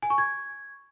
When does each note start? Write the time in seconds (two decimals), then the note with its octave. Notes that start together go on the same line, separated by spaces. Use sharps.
0.03 G#5
0.10 C#6
0.18 G#6